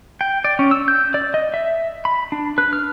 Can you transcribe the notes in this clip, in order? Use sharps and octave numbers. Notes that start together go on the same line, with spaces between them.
G5
D5
C#4
E6
G6
D5
D#5
E5
B5
D4
B4
F6